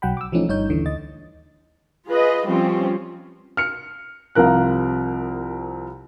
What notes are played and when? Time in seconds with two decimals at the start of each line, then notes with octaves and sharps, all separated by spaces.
0.02 B1 F#3 F#5 G5 B5
0.17 D6 E6
0.32 E3 F3 A3 C#4 D#4
0.48 G1 G2 D#4 C#5 G6
0.69 D#2 D3 E3
0.86 D2 D#5 A6
2.07 F4 G#4 B4 D#5
2.45 F3 G3 C4 C#4 F4
3.57 F6 C#7
4.35 C2 C3 F3 A#4 F#6